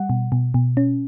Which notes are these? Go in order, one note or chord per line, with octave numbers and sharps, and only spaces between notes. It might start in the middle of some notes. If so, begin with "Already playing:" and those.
Already playing: G3 F#5
B2
B2
B2
C#4